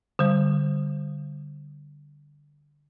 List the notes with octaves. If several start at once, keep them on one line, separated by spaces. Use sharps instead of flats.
D3 G3